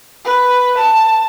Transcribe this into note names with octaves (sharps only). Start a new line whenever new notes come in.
B4
A5